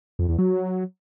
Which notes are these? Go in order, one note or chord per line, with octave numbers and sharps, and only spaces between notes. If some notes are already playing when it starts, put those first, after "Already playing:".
F2
E2
F#3